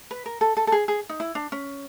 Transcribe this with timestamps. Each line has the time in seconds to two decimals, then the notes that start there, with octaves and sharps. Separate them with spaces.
0.11 B4
0.26 A#4
0.41 A4
0.57 A4
0.67 A4
0.72 G#4
0.88 G#4
1.09 D#4
1.20 E4
1.35 D4
1.52 C#4